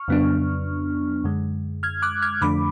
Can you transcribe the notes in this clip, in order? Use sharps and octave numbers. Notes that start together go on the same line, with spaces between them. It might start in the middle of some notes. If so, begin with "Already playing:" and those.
Already playing: C#6 F6
F2 C#3 F#3 B3 D4
F#2 D3 G#3
F6 G#6
D6 F#6
F6 G#6
F2 D3 F3 A3 D4 B5 D6